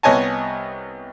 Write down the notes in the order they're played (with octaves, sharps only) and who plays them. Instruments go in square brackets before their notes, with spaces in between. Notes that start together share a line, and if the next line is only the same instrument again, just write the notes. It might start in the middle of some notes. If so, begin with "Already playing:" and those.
[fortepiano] C2 B3 C#5 D#5 G#5 A5